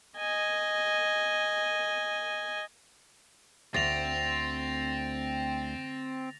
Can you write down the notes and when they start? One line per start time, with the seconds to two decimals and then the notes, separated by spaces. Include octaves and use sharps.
0.18 D#5 G#5
3.74 D2 C4 A6 A#6 F7